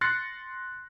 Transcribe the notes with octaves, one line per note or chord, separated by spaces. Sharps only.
C6 F#6 A6 A#6 C7 C#7